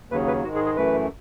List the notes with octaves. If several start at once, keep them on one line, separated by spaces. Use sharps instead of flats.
D#2 C#3 F#3 B4
B4
G#2 D#3 G#3 F#4
G#4
G#4
F#2 E3 A3 B4